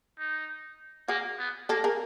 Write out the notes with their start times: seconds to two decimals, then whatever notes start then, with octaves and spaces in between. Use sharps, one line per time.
0.19 D#4
1.08 A#3 F#4 G#4
1.39 B3
1.69 A#3 G4 A4
1.84 G#4 A#4